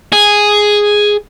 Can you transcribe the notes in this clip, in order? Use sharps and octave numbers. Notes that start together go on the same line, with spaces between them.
G#4